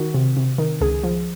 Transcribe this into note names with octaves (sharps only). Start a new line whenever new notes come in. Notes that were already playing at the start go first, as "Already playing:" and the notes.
Already playing: D#3 F#4
C3
C3
D#3
C#2 G#4
F3